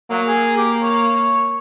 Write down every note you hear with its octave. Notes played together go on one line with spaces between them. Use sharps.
F#3 A#3
G#4
G4
C#5